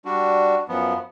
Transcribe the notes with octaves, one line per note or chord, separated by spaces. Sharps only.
G3 D4 F#4
F#2 F3 B3